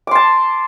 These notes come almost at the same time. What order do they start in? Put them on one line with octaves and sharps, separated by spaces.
D6 C6 A5